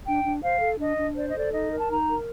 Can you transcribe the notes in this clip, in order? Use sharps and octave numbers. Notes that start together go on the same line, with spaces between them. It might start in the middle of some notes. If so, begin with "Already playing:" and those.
D4 G5
D4
C5 F5
A4
D4 D#5
D4
C5 D5
D#5
A4 D5
D#4 D#5
A#4
A5
D#4 A#5
A#4